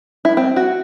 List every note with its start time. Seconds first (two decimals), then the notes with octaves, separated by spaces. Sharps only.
0.25 E4
0.37 C4
0.56 F#4